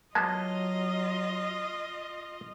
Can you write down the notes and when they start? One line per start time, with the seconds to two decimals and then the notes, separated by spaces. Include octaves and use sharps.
0.15 F#3 G#3 A#3 B3 F4 D#5 A5